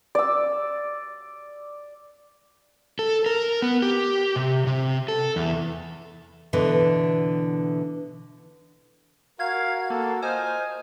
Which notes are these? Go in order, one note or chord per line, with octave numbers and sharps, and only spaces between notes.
D5 E6
A4
A#4
B3
G4
C3
C3
A4
E2
B2 D3 E3
F#4 A#4 F5 G#6
A#3 A4 A#4
F4 C5 D#5 G#5 F6